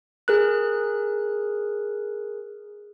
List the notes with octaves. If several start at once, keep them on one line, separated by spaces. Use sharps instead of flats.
G#4 A#4 F#6